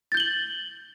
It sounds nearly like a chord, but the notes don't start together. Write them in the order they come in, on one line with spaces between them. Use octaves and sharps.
A6 G6 G7 F#7